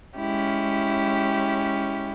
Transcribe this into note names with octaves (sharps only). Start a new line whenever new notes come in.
G#3 C#4 E4 G4